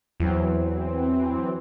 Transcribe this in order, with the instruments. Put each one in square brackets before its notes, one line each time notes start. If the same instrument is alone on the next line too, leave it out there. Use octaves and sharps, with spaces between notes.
[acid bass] E2 [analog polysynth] E3 F#3 C4